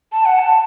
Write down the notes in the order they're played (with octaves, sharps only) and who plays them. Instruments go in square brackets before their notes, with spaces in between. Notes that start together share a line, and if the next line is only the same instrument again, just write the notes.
[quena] A5
F#5
A5